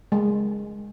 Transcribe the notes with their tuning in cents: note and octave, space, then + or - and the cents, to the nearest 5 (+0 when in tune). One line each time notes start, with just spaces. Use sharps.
G#3 -5